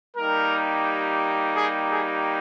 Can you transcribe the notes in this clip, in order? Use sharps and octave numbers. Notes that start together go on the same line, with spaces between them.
G3 A#3 D#4 G4 A#4
G#4
G#4